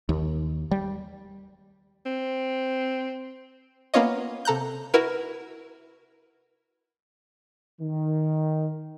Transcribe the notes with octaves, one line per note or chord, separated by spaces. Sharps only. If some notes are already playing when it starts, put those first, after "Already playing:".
D#2
G3
C4
A#3 B3 C#4 F4 C#5 D#5
C3 A4 A#5 F#6 G6
E4 F#4 A#4 B4
D#3